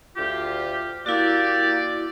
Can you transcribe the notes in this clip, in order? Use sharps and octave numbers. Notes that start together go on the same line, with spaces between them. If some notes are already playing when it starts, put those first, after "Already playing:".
D2 F4 G4
A#3 E4 F#4 G4 D5